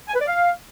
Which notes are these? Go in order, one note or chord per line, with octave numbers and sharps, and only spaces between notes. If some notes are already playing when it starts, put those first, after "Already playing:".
G#5
B4
D5
F5